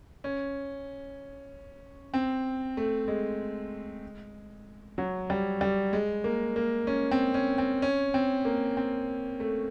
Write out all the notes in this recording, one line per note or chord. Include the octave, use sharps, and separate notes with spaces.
C#4
C4
A3
G#3
F#3
G3
G3
G#3
A#3
A#3
C#4
C4
C#4
C4
C#4
C4
A#3
C4
A3